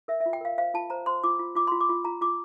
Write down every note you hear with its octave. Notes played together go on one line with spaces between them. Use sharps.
A#4 E5
E5
F4
G5
A#4 F5
C5 F5
F4 A5
C5 A#5
C5 C6
F4 D6
F4
F4 D6
F4 C6
D6
F4
F4 A#5
F4 D6